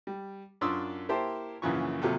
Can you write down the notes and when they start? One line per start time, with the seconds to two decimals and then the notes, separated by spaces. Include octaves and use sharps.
0.07 G3
0.61 F#2 D4 F4 C6 D#6 E6
1.09 A#3 E4 G4 C5 A5
1.62 A#1 F#2 C#3 E3 F4 C#6
2.02 D#2 C3 F#3 F4 A4